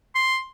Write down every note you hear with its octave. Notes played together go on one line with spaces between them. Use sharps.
C6